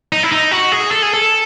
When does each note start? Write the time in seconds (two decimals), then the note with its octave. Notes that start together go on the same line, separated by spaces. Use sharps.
0.12 D#4
0.23 E4
0.32 D#4
0.51 F#4
0.72 G#4
0.91 A4
1.02 G#4
1.14 A4